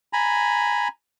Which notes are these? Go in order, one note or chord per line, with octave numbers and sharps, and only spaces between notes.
G#5 A#5 B5